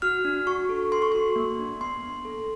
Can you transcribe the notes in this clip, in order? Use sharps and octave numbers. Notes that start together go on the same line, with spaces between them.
F#4 F6
D4
F#4 C#6
A4
A4 C6
C#6
F#4 C6
A#3
D4
B3 C6
B3
A4